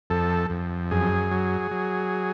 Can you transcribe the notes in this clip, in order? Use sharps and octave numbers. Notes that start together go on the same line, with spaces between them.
F2 A4
F2
F#2 G#4
F#3
F#3